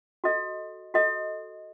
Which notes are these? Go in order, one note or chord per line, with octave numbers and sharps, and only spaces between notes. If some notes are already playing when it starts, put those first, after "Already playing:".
F#4 A4 D#5
F#4 A4 D#5